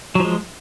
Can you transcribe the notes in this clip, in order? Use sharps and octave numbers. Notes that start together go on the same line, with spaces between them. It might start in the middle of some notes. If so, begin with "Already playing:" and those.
F3 F#3 G#3